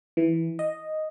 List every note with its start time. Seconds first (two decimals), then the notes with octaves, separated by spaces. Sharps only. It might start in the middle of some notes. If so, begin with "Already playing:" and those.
0.17 E3
0.59 D#5